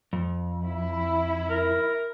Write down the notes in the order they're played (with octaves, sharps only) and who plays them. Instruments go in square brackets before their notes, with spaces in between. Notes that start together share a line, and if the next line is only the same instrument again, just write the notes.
[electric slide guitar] F2
[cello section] E4
[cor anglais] A#4